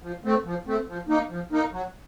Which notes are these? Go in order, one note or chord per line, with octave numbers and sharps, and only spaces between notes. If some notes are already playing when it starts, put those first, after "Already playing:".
F3
A3 C4
F3
A3 C4
F3
A#3 D#4
F3
A#3 D#4
F#3